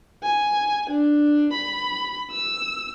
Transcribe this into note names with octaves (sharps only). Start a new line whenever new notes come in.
G#5
D4
B5
E6